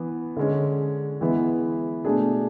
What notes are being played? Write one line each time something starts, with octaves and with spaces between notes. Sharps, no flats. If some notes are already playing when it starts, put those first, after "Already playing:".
Already playing: E3 B3
D3 G#3 C#4
E3 G#3 B3 E4
B2 A3 D4 G#4